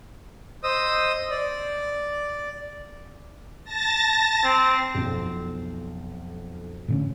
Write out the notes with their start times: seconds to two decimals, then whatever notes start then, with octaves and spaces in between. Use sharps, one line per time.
0.63 C5 D#5 D#6 E6
1.30 D5
3.64 A5 A6 A#6
4.44 C4
4.95 B1 F2
6.88 A2 D3 C#4